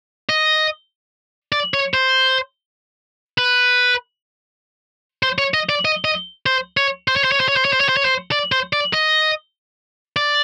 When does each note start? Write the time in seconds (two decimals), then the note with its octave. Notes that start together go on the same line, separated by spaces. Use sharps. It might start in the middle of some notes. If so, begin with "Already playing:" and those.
0.29 D#5
1.52 D5
1.74 C#5
1.94 C5
3.38 B4
5.23 C5
5.38 C#5
5.54 D#5
5.69 D5
5.85 D#5
6.05 D#5
6.46 C5
6.77 C#5
7.08 C5
7.16 C#5
7.24 C5
7.32 C#5
7.40 C5
7.48 C#5
7.56 C5
7.65 C#5
7.73 C5
7.80 C#5
7.89 C5
7.97 C#5
8.05 C5
8.32 D5
8.52 C5
8.73 D5
8.93 D#5
10.16 D5